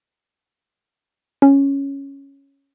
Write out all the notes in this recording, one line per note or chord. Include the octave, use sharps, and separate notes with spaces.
C#4